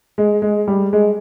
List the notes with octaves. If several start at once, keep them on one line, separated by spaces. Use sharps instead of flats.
G#3
G#3
G3
G#3